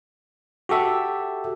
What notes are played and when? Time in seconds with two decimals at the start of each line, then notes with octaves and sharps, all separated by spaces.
0.69 F#4 G4 A4 E5